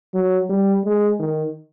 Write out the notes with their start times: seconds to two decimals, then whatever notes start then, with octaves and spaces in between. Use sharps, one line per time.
0.14 F#3
0.49 G3
0.84 G#3
1.19 D#3